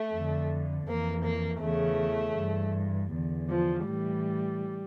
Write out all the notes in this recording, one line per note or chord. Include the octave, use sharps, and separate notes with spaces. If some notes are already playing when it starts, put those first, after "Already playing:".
Already playing: A3
F2 D3
F2 E3 A#3
A#3
E2 C#3 E3 A3
G2 E3
E2 D3
F3
A2 E3 G3